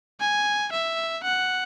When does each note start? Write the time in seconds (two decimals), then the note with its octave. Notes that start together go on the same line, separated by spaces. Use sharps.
0.20 G#5
0.72 E5
1.24 F#5